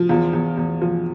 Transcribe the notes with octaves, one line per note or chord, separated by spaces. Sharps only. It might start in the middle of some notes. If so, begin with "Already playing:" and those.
Already playing: F3
E2 F4
E2
E2
F3